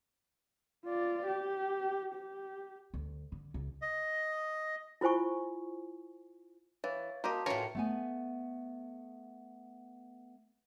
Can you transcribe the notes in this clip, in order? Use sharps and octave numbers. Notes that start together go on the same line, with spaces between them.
F4 D5
G4
G4
D2
D3
C#2
D#5
E4 F4 C5 G#5 C#6
E3 C#5 F5 A6
A#3 F#4 G4 D#5 A5 C6
A2 C#4 F4 A#4 B4 C#5
A3 B3 G#5